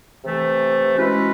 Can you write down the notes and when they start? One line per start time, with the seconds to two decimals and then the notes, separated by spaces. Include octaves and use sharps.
0.22 C3 E3 A3
0.96 E3 G#3 C#4 F#4 B4